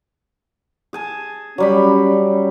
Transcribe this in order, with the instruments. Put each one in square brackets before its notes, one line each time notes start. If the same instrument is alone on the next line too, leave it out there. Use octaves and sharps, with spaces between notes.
[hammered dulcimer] G#4 G#5 A5
[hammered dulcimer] F#3 G3 B5 [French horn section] C#4